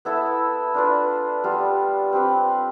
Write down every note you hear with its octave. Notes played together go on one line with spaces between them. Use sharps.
B3 E4 A4 E5
D4 F4 B4
G3 B3 F4
C4 G4 B4